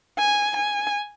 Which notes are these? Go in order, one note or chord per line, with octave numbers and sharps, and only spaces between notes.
G#5
G#5